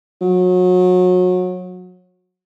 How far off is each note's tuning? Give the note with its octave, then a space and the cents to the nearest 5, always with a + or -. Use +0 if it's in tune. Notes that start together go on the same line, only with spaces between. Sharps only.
F#3 -30